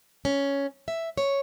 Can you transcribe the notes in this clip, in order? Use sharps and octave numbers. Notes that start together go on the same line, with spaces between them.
C#4
E5
C#5